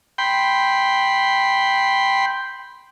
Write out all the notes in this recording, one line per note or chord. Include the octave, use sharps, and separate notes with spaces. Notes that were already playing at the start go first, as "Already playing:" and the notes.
G5 B5 C6